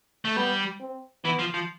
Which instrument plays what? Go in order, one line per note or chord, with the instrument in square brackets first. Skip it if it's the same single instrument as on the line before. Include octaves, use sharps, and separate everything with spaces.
[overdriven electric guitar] A3
[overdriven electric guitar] G3 [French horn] B3
[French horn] C4
[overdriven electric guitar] E3 [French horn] B3
[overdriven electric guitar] F3
F3